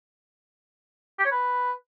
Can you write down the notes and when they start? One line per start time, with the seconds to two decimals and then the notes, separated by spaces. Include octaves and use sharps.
1.19 G4
1.25 C#5
1.31 B4